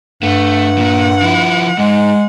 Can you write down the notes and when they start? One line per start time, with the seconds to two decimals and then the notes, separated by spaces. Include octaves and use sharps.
0.23 G2 A3 F#5
0.78 A#2
1.22 F3 E4
1.78 G#2 G#3